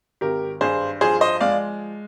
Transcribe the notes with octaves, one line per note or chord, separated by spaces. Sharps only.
G#1 G4 A#4
G2 G#4 C5
F3 G#4 C5
C5 D#5
G#3 D5 F5